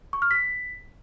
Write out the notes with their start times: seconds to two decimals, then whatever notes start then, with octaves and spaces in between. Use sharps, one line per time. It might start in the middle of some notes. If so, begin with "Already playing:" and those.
0.13 C#6
0.22 F6
0.31 B6